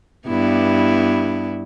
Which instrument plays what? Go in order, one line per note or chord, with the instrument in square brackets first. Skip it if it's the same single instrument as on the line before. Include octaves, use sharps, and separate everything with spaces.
[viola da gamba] G2 B3 E4